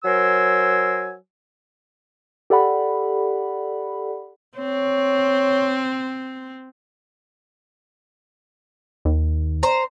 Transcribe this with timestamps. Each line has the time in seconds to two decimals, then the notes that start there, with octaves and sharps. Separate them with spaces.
0.04 F#3 A#4 C5 G#5 E6
2.50 G4 A4 D5 F#5 B5
4.58 C4 C#5
9.05 D#2
9.63 C5 A#5